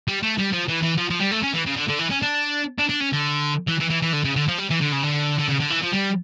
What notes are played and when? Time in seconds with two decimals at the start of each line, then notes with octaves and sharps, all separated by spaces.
0.08 G3
0.23 A3
0.38 G3
0.52 F3
0.69 E3
0.83 E3
0.97 F3
1.10 F3
1.20 G3
1.31 A3
1.43 C#4
1.54 E3
1.66 C#3
1.76 D3
1.88 D3
1.99 E3
2.10 C#4
2.22 D4
2.78 D4
2.89 D4
3.00 C#4
3.13 D3
3.68 E3
3.80 E3
3.90 E3
4.02 E3
4.13 D3
4.24 C#3
4.36 D3
4.48 F3
4.59 G3
4.70 E3
4.81 D3
4.92 C#3
5.03 D3
5.39 D3
5.49 C#3
5.60 D3
5.71 E3
5.83 F3
5.93 G3